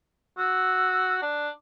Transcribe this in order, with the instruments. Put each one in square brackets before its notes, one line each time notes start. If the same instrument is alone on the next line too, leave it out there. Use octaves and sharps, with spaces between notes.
[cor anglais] F#4 [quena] E6
[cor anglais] D4